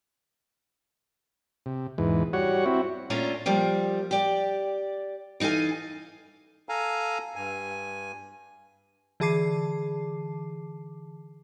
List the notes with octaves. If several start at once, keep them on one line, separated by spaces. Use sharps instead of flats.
C3
E2 G#2 E3
G3 F#4 C#5 F#5
C4 E4 F#4
A#2 A3 C#4 D4 F4 A#5
F3 G3 A#3
G4 D5
E3 D#4 A4 F5 G#5
A4 F5 G#5 A#5
G2 G#5
D3 E3 G#4 A5 D6 C7